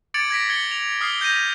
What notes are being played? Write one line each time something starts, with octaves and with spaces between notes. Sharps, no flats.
D6 G#6 A6 C#7 D7 F#7
G#6 A#6 B6 D7
G#6 C#7 G7
F7
D#6 F6 A#6 C7 G7
G6 A#6 B6 D#7